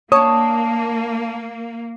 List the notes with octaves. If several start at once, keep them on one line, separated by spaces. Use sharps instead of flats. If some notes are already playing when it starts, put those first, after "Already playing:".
A#3 D4 C#5 A5 D#6